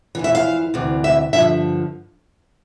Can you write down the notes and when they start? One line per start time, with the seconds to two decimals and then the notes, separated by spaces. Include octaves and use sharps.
0.15 F2 E3
0.24 E5
0.35 F5
0.74 D2 C3 E3
1.04 E5
1.33 G2 D3 F3 E5